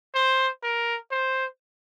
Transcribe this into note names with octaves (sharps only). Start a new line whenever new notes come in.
C5
A#4
C5